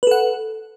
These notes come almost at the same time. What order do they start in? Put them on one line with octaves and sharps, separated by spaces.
B4 A4 F#5